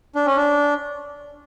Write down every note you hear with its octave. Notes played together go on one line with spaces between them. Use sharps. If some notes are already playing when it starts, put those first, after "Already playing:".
D4
C#4
D4